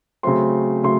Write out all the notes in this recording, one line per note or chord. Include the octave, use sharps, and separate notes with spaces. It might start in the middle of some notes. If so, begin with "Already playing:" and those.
C#3 F#3 A3 C4 C6
C#3 F#3 A3 C6